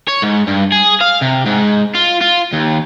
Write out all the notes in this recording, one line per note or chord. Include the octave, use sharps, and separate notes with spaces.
C#5
G#2
G2
G#4
F5
C3
G#2
F4
F4
D#2